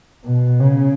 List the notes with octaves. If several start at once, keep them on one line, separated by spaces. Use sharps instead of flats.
B2
C#3